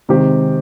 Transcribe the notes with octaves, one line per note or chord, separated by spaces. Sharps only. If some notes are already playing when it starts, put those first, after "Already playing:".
C3 D#3 G#3 C4 G4